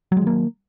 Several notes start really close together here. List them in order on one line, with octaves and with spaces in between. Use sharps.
F#3 G#3 D#3 A#3